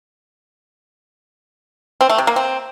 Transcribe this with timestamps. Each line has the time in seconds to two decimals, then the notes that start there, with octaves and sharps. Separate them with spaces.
2.01 C4
2.10 A3
2.18 C3
2.27 A#3
2.36 C4